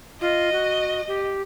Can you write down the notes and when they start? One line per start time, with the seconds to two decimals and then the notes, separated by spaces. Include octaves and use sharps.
0.21 F4 D#5
0.52 F#4
1.08 G4